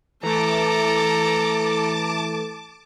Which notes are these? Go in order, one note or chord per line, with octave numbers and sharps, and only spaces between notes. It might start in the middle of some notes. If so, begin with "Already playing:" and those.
E3 A3 A4 A5 A#5 D6